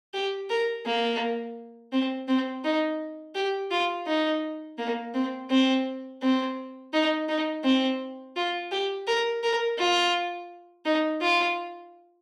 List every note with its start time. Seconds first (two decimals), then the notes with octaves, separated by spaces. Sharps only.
0.14 G4
0.50 A#4
0.86 A#3
1.92 C4
2.28 C4
2.64 D#4
3.35 G4
3.71 F4
4.07 D#4
4.78 A#3
5.14 C4
5.50 C4
6.22 C4
6.93 D#4
7.29 D#4
7.64 C4
8.36 F4
8.71 G4
9.07 A#4
9.43 A#4
9.79 F4
10.85 D#4
11.22 F4